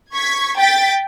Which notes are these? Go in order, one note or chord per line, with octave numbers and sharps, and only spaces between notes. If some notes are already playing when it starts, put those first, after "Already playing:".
C#6 G#6 B6
G5 A6 B6